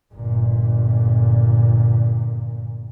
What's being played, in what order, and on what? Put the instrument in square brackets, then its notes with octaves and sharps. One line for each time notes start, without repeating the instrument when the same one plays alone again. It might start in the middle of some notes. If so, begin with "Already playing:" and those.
[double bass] G1 A#2